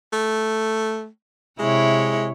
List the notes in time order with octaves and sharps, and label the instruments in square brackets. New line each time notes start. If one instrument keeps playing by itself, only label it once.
[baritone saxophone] A3
[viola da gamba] C3 E4 C#5 [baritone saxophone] G#3